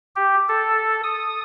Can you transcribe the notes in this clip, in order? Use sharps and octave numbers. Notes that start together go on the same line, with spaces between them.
G4
A4
D#6